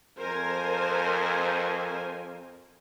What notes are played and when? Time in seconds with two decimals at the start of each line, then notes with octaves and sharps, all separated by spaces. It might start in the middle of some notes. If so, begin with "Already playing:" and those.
0.19 F2 A#4 C5 G#5